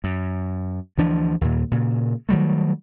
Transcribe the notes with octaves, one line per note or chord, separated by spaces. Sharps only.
F#2
D2 E3 F3 D4
D#2 A#2
A#2 C#3
D#3 F#3 G3 A3